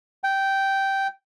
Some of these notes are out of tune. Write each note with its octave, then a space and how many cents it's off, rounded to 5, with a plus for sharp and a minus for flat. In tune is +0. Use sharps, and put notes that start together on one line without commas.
G5 -10